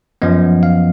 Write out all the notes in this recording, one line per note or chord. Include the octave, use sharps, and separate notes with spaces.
F#2 F3 B3 D#5
F5